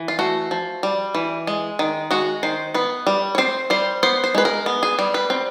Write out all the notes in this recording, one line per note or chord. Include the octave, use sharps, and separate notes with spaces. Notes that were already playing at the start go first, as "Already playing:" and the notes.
Already playing: E3
F4
A3 F#4
F3
G3
E3
G#3
D#3
G#3 F#4
D#3 C5
B3 B4
G3
C#5
C4 C5
G3 C5
B3 C5
C5
G#3 B4
A#4
B3
G#4
G3
B4
C4